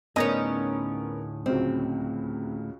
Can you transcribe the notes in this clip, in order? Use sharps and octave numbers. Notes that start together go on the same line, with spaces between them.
D2 A2 B3 C#4 D#4 G#4 A#4 D#5
C#2 C#3 F#3 C4